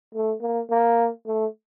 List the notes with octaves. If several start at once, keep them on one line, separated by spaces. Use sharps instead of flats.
A3
A#3
A#3
A3